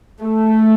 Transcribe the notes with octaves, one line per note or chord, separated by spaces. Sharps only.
A3